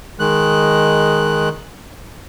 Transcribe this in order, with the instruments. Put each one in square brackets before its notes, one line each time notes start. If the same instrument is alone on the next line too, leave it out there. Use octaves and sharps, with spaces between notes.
[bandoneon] D#3 G#3 F#6